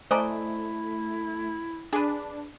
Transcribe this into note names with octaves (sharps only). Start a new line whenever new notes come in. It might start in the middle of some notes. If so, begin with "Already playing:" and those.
A3 E4 C5 D5 D#5 G#5 A#5
D4 G#4 B4